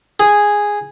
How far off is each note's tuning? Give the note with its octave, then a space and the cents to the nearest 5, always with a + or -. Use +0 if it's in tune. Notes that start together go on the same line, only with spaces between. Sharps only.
G#4 -5